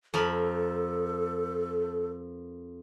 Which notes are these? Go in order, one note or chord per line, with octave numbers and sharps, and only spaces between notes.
F2 A4 A#4 B5